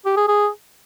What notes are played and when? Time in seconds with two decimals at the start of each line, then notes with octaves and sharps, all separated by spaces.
0.06 G4
0.17 G#4
0.28 G#4